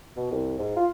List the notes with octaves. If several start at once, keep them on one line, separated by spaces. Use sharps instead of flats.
B2
C2
G#2
F4